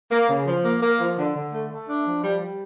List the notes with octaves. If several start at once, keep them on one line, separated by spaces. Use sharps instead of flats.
A#3
C#3
F3
A#3
A#3
F3
D3
D3
A3
A3
D4
F3
G3
G3